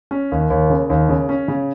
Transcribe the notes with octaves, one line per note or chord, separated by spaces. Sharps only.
C#4
D#2
D#2
C#3
D#2
C#3
C#4
C#3